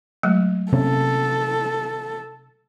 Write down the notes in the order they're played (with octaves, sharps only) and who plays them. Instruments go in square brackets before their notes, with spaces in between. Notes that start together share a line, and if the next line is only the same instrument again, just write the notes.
[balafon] F#3 G#3 A3
[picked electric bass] C3 A#3 C#4 [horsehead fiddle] A4